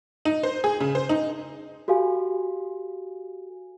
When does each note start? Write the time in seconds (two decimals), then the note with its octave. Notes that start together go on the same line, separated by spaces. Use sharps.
0.25 D#4
0.43 C5
0.64 G#4
0.80 C#3
0.95 C5
1.09 D#4
1.88 F#4 G4 A4 F5 G#5